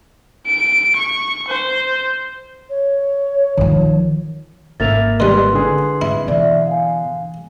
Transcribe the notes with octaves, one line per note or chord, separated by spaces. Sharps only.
D7
C#6
C5
C#5
D#3 F3
G#1 A#3 E5 A6 F7
D#3 G3 B4 C6 F#6
D3 G#4
G#2 E4
B2 E3 D5 E5
F5 G#5